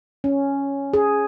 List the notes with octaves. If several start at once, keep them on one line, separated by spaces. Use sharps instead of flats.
C#4
G#4